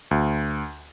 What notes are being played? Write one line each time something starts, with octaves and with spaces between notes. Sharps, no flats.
D2